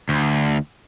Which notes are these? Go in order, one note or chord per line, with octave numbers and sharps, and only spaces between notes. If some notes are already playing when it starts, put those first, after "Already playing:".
D2